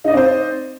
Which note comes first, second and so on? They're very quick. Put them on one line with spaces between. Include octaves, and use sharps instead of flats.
D#4 D#5 D5 C4 C5